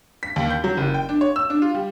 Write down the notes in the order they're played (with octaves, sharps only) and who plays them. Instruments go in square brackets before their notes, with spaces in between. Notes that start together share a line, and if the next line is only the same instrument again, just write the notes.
[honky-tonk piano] B6
D#2
G6
F#3
F#1
G5
D4
C#5
E6
D4
F4
G3